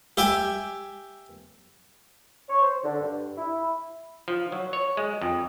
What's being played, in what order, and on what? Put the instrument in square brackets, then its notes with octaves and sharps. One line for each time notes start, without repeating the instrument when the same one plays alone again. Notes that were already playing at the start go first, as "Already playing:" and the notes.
[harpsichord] G4 E5 G5 G#5
[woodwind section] C#5
C5
D3
G2
E4
[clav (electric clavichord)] F3
F#3
C#5
G#3
F2